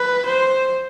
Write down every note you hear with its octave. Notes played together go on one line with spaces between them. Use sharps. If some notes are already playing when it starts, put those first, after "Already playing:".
Already playing: B4
C5